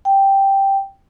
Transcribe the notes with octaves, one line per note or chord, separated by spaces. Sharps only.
G5